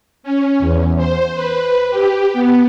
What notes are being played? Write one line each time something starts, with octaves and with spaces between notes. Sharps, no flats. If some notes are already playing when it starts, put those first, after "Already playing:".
C#4
E2
C5
B4
G4
B3